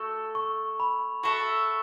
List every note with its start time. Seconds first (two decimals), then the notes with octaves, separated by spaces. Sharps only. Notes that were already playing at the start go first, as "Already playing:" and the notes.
Already playing: A3 F#4 A4 C#5
0.35 C#6
0.80 B5
1.23 F#4 A4 E5 C#6